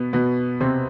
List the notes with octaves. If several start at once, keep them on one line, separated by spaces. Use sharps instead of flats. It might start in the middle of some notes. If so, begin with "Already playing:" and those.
Already playing: B2 B3
B2 B3
C3 C4